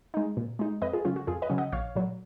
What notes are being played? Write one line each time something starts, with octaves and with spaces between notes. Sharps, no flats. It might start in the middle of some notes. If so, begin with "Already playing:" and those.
G#3 D#4
A#2
G#3 D#4
F2 B4 D#5
F4 G#4
C#3 F#3 C#4 F4
F#4
F2 F4 G#4
B4 D#5
C#3 F#3 C#4
D#5 F#5
A#1 C#5 F5
A#2 F#3